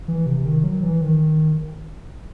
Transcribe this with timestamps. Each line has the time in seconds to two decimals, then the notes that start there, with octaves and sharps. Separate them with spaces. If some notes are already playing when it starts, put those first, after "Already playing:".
0.08 E3
0.26 C3
0.46 D#3
0.64 F#3
0.83 E3
1.01 D#3